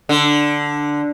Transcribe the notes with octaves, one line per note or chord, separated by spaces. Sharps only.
D3